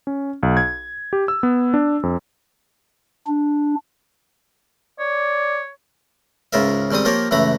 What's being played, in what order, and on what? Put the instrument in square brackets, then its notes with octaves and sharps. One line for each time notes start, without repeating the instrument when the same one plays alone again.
[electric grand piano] C#4
B1
G#6
G4
E6
B3
D4
F2
[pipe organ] D4
[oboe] C#5 [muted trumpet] D5
[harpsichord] C#2 G#2 C#3 F4 A#4 E5
G#2 D#3 G3 C4 D#6
F3 A#3 F4 G4 A#4 C#5
C#2 F#2 E3 A3 A#5 B5